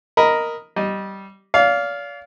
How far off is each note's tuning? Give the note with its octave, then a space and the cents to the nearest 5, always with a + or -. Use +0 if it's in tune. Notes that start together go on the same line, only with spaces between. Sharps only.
A#4 +0 D#5 +0 B5 +0
G3 -15 D#5 -10
D5 -40 F5 +0